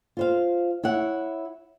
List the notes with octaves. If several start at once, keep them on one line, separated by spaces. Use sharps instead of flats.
F4 C5 F5
E4 C#5 F#5